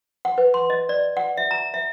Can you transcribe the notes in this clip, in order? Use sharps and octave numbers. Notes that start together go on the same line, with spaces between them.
F#5
B4
C6
D#5
D5
F#5
E5
A#5
E5